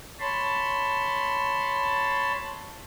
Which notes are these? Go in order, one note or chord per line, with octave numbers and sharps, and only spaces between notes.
C#5 A5 B5 C6